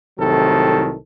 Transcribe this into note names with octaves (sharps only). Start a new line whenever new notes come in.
C2 A2 C3 D#3 F#3 A4